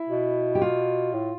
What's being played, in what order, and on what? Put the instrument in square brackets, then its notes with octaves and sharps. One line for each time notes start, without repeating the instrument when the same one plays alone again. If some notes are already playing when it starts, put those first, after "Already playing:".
Already playing: [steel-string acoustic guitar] E4
[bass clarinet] B2
[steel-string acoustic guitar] G4
F4
[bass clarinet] A2